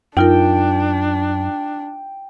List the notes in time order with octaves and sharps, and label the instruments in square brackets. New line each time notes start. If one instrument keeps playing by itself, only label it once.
[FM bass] F#2 [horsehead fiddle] D4 [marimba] D#4 F4 A#4 [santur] G5